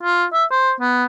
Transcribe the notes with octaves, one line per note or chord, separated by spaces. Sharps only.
F4
E5
C5
B3